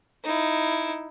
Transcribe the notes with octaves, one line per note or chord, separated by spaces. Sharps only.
D#4 E4